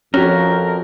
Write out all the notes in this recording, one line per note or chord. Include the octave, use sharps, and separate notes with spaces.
F2 C#4 F#4 G4 A#4 C#5